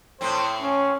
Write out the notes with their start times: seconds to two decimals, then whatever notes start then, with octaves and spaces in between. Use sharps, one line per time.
0.21 A2 C4 C5
0.62 C#4